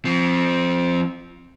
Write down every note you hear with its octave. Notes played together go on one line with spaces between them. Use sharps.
F3 C4